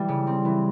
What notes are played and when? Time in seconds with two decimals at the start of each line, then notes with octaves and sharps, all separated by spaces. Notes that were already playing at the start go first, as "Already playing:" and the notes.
Already playing: E3 G3
0.08 C#3
0.27 C4
0.45 E3